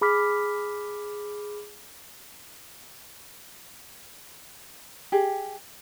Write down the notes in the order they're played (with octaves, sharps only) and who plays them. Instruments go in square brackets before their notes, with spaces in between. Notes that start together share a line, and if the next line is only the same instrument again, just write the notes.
[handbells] G#4 B5 D6 F6 B6
[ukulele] G4 G#4